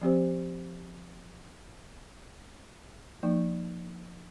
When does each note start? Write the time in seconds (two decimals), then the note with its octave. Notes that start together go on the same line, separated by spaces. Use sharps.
0.01 F3 C4 G4 C5
3.23 F3 A#3 D#4